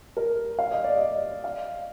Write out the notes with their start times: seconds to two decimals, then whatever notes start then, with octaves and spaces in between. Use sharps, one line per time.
0.17 A#4
0.59 F5
0.71 D#5
0.84 D5
0.97 D#5
1.44 F5